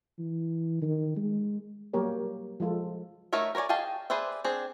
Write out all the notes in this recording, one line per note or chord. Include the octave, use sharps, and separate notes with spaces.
E3
D#3
G#3
F#3 G3 A#3 G4 A#4 C#5
F3 G#3 F4 A4
A3 D#4 A#4 C#5 E5
A#4 B4 C#5 D5 G#5
G#4 D#5 F5 G5 A5
G#4 B4 C5 D5 E5
C4 D4 G#4